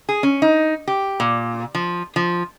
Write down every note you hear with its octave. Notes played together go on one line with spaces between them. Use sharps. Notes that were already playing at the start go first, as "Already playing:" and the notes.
G#4
C#4
D#4
G4
A#2
F3
F3